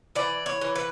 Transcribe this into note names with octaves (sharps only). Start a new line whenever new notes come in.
E3 D5
C#5
E3
B4